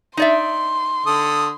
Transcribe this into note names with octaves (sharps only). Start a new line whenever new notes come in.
D#4 D5 E5 C6
D3 A4 D#6